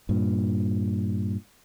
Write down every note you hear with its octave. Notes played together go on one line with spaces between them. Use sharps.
G2 A#2